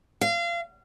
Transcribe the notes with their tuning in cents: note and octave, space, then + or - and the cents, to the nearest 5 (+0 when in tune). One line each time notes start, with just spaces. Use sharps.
F5 -30